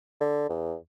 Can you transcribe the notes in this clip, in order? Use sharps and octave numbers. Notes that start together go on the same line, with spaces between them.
D3
E2